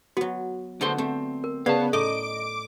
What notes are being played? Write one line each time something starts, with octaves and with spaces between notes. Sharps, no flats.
F#3 B3 F#4
D3 A3 B3 D4 C5 C6
A3 C4
A#4
C#3 B3 D5 F5 A5
A2 D#4 A4 D#5 D6